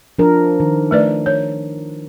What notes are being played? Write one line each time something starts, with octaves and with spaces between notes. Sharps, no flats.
F3 D4 A#4
D#3
A3 B4 D5
C#5